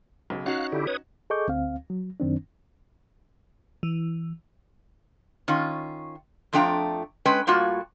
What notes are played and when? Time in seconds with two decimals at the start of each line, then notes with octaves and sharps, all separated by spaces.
0.30 B1 C#3
0.46 C#4 D#4 F#4 F5 F#6
0.72 D3 E4 G4
0.87 B4 C#5 D#6
1.30 G#4 A4 D#5 C#6 D6 G6
1.48 D2 C4 F5
1.90 F#3
2.20 F#2 D#3 C4 D4
3.83 E3
5.48 D#3 C#4 F4
6.53 F2 F3 A3 D4 G5 A#5
7.26 G#3 C#4 B4 G5
7.47 A2 G3 A#3 F4 F#4